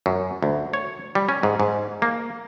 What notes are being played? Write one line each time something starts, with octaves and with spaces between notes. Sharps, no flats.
F#2
D2
C#5
G3
C#4
G#2
G#2
A#3